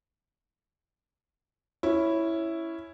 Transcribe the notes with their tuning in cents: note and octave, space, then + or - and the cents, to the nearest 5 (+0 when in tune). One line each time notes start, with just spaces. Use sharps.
C#4 +0 E4 +0